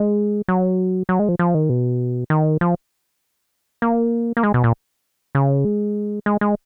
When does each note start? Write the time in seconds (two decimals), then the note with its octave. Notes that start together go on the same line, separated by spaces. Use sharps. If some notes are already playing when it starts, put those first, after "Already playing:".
Already playing: G#3
0.48 F#3
1.09 F#3
1.19 G#3
1.29 F3
1.39 F3
1.55 D#3
1.69 B2
2.30 D#3
2.61 F3
3.82 A#3
4.37 A#3
4.43 G#3
4.54 B2
4.64 A#2
5.35 C#3
5.65 G#3
6.26 G#3
6.41 G#3